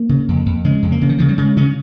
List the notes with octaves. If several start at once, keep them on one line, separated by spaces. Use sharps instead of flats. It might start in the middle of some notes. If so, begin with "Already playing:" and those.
Already playing: A#3
C#3
F2
F2
C#3 G#3
F2
A#3
C#3
D#3
C#3 F3
G3
C#3 G#3
C#3 C#4